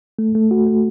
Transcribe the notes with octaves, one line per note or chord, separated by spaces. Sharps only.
A3
A3
F#4
A3